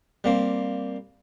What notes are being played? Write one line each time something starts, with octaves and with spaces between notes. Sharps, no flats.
G3 A#3 C4